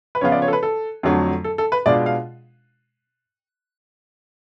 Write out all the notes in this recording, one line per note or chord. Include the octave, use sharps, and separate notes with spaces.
B4
C#3 F3 B3 F4 C#5
D5
C#5
A4
B4
A4
F2 D3 F#3 A3
A4
A4
B4
B2 G#3 D4 F4 D5
F5